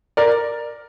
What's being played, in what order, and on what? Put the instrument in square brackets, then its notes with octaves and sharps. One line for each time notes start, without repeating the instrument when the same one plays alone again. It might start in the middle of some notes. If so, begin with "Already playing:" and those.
[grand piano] A#4 D5